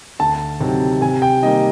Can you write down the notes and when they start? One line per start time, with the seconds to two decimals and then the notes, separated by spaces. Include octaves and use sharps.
0.19 D2 A5
0.60 C3 D#3 F#3
1.01 C3 G#5
1.22 G5
1.43 D#3 G3 A#3 D#5